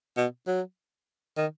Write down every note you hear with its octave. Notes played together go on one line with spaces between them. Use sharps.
B2
F#3
D#3